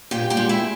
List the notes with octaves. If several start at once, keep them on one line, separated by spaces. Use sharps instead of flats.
A#2 G4 G5
G4 G5
G#3
E4 E5